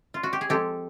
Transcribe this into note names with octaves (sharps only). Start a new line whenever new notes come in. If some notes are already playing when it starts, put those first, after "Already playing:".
F4
F#4
G4
G#4
F3 G#3 C4 G4 A4